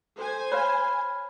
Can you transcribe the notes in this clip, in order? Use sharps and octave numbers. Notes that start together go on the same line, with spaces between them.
A4 C5 G#5
C#5 F5 B5 F6 G#6